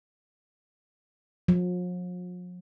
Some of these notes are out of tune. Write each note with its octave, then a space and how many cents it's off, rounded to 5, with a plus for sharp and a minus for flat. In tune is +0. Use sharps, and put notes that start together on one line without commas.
F3 +45